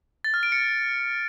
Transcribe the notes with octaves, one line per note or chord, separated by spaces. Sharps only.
A6
F6
D7
C#7